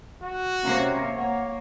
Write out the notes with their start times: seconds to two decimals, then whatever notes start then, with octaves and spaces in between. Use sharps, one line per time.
0.23 F#4
0.63 C3 A#3 C#4 C#5
1.16 A#3 C#5 F#5